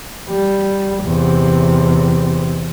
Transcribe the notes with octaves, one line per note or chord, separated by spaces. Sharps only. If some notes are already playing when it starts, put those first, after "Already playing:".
G3
E2 C3